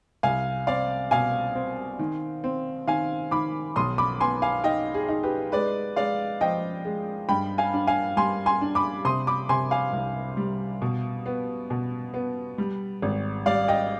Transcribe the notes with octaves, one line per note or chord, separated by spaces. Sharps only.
C2 F5 G#5
C4 D5 F5
B2 F5 G#5
C4
D#3
C4
D#3 F5 G#5
D#3 B5 D6
B1 C6 D#6
B5 D6
B3 G#5 C6
F5 G#5
D#4 D#5 G5
G#4
D#4
G4 B4
G#3 B4 D5
G#3 D5 F5
F3 D#5 G5
G#3
G2 G5 B5
F5 G#5
D4
F5 G#5
G3 G#5 C6
G#5 C6
D4
B5 D6
C3 C6 D#6
B5 D6
C3 G#5 C6
F5 G#5
C2
G3
B2
B3
B2
B3
G3
G#1
G3 D5 F5
D#5 G5